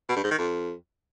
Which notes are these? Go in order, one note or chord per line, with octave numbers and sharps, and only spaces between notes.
B2
G2
G#2
D#3
F2